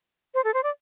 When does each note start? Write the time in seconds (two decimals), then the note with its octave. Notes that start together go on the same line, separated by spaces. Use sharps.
0.34 C5
0.44 A4
0.54 C5
0.63 D5